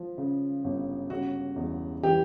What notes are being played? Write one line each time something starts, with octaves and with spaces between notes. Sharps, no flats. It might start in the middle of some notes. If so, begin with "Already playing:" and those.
Already playing: F3
C#3
G1
C#3 F#4
E2
E3 G4